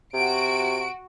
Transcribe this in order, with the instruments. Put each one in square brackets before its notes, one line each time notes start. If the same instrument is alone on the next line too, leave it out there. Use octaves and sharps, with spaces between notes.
[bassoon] C3 [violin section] F#4 D7